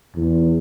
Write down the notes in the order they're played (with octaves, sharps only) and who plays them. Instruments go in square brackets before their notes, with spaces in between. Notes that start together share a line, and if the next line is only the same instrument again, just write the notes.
[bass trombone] E2